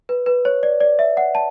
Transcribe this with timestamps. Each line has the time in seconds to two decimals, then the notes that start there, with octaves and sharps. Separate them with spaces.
0.09 B4
0.26 B4
0.45 C#5
0.63 D5
0.81 D5
0.99 E5
1.17 F#5
1.35 A5